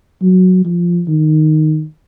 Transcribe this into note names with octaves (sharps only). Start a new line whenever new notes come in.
F#3
F3
D#3